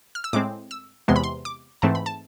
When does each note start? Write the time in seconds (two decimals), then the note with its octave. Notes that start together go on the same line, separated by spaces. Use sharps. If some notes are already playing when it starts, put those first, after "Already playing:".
0.15 F6
0.24 E6
0.33 A2 G#3 C4 D6
0.71 E6
1.08 E2 C3 E3 G#3 B3 C6
1.16 B5
1.24 C6
1.45 D6
1.82 G#2 E3 A3 C4 A5
1.95 B5
2.06 A5